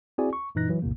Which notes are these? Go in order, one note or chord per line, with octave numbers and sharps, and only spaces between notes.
C4 E4 F#4 G#4 D5 G#5
C#6
F#2 A#2 E3 D#4 F#6 A#6
E3 F#3
A#1 E2 A2 C3 A#3